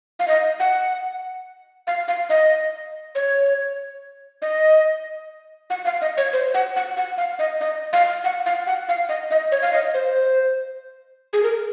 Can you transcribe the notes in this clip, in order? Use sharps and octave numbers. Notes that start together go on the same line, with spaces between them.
F5
D#5
F#5
F5
F5
D#5
C#5
D#5
F#5
F5
D#5
C#5
C5
F#5
F#5
F#5
F5
D#5
D#5
F5
F#5
F5
F#5
F5
D#5
D#5
C#5
F5
D#5
C5
G#4
A#4